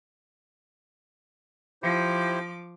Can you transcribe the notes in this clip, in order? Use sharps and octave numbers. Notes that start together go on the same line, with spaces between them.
F3 E4 G4 C5 D6